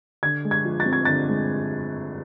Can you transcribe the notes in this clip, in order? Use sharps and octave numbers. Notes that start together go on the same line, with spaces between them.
D3 G#6
G#3
G#6
F3
A6
C4
G#6
D3 A6
G#3